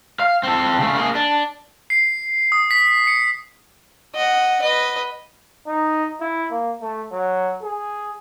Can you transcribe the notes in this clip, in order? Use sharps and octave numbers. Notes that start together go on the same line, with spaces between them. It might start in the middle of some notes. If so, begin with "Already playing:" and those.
F5
C4 A4
C#3 A3
A#3 G#4
D4
C7
D#6
B6
C#7
D#5 F#5
B4 D#5
D#4
E4
A#3
A3
F#3
G#4